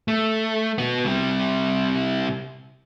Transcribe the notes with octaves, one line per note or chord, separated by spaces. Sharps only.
A3
B3 F#4
C3 G3